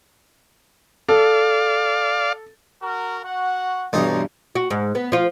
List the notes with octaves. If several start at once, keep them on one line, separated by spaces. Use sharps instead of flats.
A4 D5 F5
F#4 A#4
F#4 F#5
B1 G2 E3 D#4
F#4
G#2
B3
F3 F4